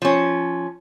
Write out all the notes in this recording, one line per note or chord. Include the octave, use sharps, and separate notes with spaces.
F3 C#4